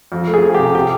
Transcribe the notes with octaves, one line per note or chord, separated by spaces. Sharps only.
F2
A3
G#4
F3
C3 G4
C3 G4